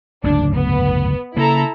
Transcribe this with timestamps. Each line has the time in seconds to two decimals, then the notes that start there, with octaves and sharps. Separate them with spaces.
0.24 F#1 D2 G#2 D4
0.55 B3
1.36 C#3 A#3 E4 A4 A#5